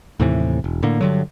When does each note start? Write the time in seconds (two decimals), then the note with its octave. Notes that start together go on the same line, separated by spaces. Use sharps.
0.20 D#2 A2 C3 E3
0.64 E1
0.83 A2 D3 A#3
1.01 G2 D3 F#3